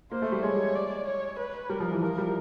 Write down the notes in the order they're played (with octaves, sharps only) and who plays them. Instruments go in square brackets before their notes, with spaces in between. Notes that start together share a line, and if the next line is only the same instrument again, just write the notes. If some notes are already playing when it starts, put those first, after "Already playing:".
[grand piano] A#3 [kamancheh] C5
[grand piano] A3
G3
[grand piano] G#3 [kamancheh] C#5
[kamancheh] D5
C#5
B4
[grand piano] G3 [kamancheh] A#4
[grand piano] F3
E3
[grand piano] F3 [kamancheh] A#4
[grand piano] G3